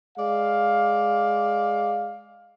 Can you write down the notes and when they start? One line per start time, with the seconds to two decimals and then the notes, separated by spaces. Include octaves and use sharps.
0.18 G#3 D5 F5